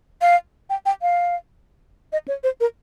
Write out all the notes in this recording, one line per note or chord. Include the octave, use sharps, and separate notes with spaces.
F5
G5
G5
F5
D#5
C#5
C5
A#4